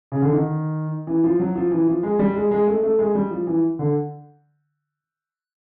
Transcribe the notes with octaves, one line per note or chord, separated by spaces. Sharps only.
C#3
D3
D#3
E3
F3
F#3
F3
E3
F3
G#3
G3
G#3
G#3
A3
A3
G#3
G3
F3
E3
D3